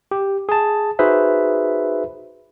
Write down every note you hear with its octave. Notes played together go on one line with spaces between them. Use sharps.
G4
G#4 A5
D#4 F#4 G#4 B4 C5 E5